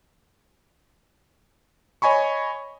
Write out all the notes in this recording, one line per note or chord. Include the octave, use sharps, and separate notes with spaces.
C#5 D#5 G#5 B5 C#6